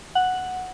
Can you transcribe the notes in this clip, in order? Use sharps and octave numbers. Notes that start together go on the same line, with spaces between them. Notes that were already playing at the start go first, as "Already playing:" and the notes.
F#5